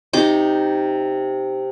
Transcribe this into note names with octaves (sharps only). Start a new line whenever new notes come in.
C3 D#4 D6